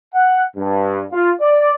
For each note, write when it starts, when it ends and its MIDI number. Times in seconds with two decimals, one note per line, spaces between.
0.14 0.43 78
0.57 1.03 43
1.12 1.32 65
1.41 1.74 74